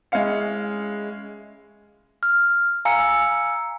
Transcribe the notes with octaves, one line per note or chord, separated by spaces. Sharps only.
G#3 C#4 E4 F5 C#7
F6
F5 G#5 A#5 E6 C#7